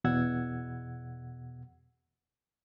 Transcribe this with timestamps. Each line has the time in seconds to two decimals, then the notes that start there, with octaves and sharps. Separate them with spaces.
0.04 E2 B2 F#5 E6 G#6